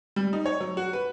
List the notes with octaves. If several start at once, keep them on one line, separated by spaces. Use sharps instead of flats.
G3
D#4
C#5
F#3
F#4
B4